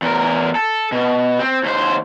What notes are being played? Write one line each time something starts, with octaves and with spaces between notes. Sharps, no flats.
E2 A#4
A4
B2
C4
D#2 C5